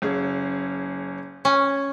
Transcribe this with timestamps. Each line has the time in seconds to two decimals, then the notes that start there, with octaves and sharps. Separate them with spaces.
0.02 F#1 C#4 G#4
1.45 C#4